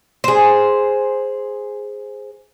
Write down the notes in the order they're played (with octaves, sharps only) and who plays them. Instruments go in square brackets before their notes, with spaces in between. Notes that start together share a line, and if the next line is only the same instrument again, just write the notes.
[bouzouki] G#4 C5